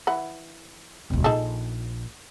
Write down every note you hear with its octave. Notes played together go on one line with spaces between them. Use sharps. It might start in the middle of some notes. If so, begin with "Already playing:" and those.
E3 F#5 B5
E1 D2
A#1 D#4 G#4 A4